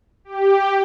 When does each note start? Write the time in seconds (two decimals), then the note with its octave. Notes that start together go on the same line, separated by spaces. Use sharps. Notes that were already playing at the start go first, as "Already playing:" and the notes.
0.24 G4